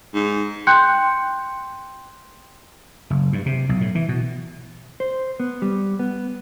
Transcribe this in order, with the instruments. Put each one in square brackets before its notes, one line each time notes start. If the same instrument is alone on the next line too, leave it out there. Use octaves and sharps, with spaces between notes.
[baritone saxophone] G#2
[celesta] G5 C6 F#6 G6 C#7
[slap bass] F#1
G2
C3
B1
A2
E3
B2
[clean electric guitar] C5
B3
G3
B3